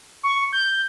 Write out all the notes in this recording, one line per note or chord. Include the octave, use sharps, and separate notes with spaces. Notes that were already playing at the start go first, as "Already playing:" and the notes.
C#6
G6